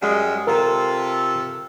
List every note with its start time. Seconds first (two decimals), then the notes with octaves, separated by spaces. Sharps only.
0.02 F#2 G3 G#3
0.47 C3 F4 A4 A#4